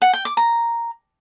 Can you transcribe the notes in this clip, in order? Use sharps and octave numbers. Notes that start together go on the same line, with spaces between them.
F#5
G5
D6
A#5